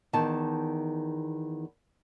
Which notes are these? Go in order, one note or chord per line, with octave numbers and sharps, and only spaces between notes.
E2 D#3 A5